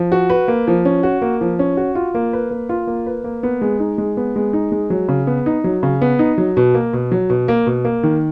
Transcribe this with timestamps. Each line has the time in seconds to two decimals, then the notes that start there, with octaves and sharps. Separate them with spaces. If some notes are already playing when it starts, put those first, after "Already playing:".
Already playing: F3
0.12 F#4
0.30 B4
0.48 A#3
0.68 F3
0.85 C#4
1.03 F#4
1.22 A#3
1.41 F3
1.59 C#4
1.77 F#4
1.95 F4
2.15 A#3
2.33 B4
2.51 A#3
2.69 F4
2.87 A#3
3.06 B4
3.24 A#3
3.43 B3
3.62 G#3
3.80 D#4
3.98 G#3
4.17 B3
4.36 G#3
4.53 D#4
4.72 G#3
4.90 F#3
5.08 C#3
5.27 B3
5.46 D#4
5.64 F#3
5.83 C#3
6.02 B3
6.19 D#4
6.38 F#3
6.57 B2
6.75 A#3
6.93 B2
7.12 F#3
7.30 B2
7.48 A#3
7.67 B2
7.85 A#3
8.03 D#3